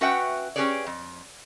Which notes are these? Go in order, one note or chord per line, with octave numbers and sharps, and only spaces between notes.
C#4 F#4 B4 E5 F#5 G5
C#4 G4 G#4 B4 C#5 D5
F2